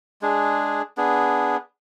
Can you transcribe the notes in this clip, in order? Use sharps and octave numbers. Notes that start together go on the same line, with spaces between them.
G#3 D4 G#4
B3 D4 G#4